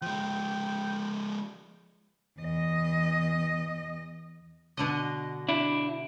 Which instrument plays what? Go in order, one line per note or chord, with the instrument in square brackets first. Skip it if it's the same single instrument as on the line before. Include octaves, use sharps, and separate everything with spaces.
[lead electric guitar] F3 G#3 [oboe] G5
[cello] E2 D#5
[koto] B2 D3 D#5
[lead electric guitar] D4 E4